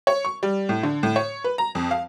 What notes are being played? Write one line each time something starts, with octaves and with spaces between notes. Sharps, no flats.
C#5
C#6
G3
A2
D3
A2
C#5
B4
A#5
F2
F5